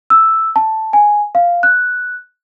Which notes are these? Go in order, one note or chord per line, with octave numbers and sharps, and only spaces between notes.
E6
A5
G#5
F5
F#6